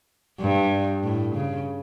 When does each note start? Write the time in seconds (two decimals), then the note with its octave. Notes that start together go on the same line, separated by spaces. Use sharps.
0.40 G2
1.03 A2
1.35 C#3